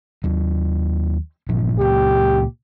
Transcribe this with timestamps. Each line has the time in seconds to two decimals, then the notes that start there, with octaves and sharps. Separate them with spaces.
0.24 D#2 F#3
1.49 G1 A#2 F3
1.79 C#2 A#2 G4